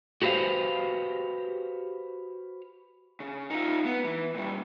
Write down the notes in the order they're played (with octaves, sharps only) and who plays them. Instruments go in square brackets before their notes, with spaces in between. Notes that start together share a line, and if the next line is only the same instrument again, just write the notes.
[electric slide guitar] F#4 G4 B4 C5 F5
[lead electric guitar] C#3
D#4 F4
B3
E3
A#2 G3